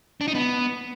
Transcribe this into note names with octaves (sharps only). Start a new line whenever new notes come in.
D4
D#4
B3